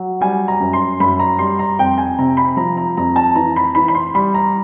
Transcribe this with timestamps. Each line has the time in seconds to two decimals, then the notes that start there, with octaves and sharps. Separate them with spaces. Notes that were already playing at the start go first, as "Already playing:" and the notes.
Already playing: F#3
0.21 G3 G#5
0.48 A#5
0.60 F#2
0.73 C6
1.00 F#2 B5
1.19 A#5
1.39 G3 C6
1.59 A#5
1.79 F2 G5
1.98 G#5
2.19 C3 A#5
2.37 B5
2.57 F3 A#5
2.77 A#5
2.97 F2 A#5
3.16 A5
3.36 E3 A#5
3.56 B5
3.75 E3 B5
3.88 B5
3.95 C6
4.14 G3 B5
4.34 A#5